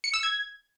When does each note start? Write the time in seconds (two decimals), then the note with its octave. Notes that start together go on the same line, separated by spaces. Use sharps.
0.04 C#7
0.14 E6
0.23 G#6